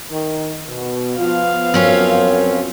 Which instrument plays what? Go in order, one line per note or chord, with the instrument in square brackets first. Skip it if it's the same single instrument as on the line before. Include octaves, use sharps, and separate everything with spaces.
[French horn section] D#3
B2
[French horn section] F3 B3 [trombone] F4 [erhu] F5
[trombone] F#2 [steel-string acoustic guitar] C4 C#4 F4